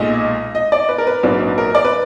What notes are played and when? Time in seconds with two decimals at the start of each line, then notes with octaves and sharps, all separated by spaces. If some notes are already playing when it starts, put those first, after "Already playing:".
Already playing: B1 A#2 G#3 D#5
0.55 D#5
0.72 D5
0.89 B4
0.98 A#4
1.07 B4
1.23 A#1 G#2 F#3 A#3 D4
1.58 A#4
1.75 D5
1.85 B4